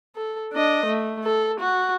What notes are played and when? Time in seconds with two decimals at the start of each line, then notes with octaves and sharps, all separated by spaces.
0.16 A4
0.53 D4 D#5
0.86 A3
1.24 A4
1.60 F#4